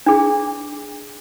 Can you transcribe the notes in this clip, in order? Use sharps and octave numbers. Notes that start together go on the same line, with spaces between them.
D4 G#4